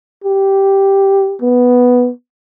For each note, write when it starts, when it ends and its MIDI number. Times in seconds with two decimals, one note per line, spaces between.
0.24 1.36 67
1.42 2.10 59